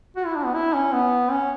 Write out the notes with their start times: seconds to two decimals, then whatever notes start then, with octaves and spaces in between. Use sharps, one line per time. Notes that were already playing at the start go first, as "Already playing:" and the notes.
0.16 F#4
0.26 E4
0.36 D4
0.45 B3
0.54 E4
0.74 C#4
0.93 B3
1.31 C#4